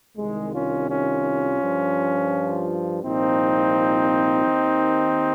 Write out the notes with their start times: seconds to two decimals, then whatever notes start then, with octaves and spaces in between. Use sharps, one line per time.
0.17 C2 C3 D#3 G#3
0.53 C#4 F4
0.89 C#4 F4
1.61 G2 F3
3.04 C2 A#2 F3 C4 D#4
4.47 D#2 D#3